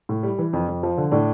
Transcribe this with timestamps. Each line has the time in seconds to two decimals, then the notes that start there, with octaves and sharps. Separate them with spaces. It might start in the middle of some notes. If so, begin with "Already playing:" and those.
0.09 A2
0.23 G3
0.39 E3
0.53 F2
0.68 F2
0.83 F3
0.98 D3
1.12 A2 D4